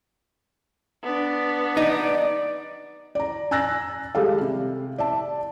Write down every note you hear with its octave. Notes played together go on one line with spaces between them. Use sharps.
B3 D4
D#4 D5
D5 A#5
G#5 A#5 E6 F#6 A6 A#6
G3 G#3 A4 F5
C3
D5 E5 A5